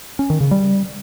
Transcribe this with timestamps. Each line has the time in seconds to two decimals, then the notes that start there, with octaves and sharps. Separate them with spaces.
0.19 C#4
0.30 D#3
0.41 C#3
0.51 G3